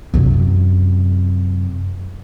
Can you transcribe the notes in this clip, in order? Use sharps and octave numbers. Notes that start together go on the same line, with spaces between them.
F#2 C3